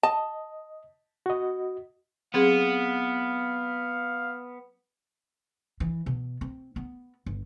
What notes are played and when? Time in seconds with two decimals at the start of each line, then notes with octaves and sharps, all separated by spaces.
0.03 D#5 A5
1.26 F#4 D#5
2.34 F#3 B3 C4 G#4 F5
5.80 E3
6.06 B2
6.41 C4
6.76 B3
7.26 G1